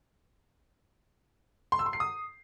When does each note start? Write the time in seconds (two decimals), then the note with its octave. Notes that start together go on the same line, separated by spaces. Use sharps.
1.72 C6
1.79 E6
1.86 C6
1.93 C7
2.00 D#6